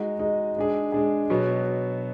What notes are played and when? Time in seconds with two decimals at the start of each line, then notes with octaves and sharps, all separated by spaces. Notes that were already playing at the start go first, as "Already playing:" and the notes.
Already playing: G#3 D#4 F#4
0.19 G#3 D#4 F#4
0.56 G#3 D4 G#4
0.92 G#3 D4 G#4
1.30 B2 F#3 B3